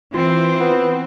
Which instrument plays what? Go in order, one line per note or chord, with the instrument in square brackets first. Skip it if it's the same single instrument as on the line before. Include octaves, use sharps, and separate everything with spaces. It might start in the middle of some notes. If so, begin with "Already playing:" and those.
[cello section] E3 C5 [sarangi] C4 [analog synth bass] F4
[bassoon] B3